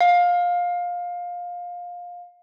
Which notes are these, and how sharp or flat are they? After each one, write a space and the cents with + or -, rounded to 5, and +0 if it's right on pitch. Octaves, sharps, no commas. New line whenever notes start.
F5 +20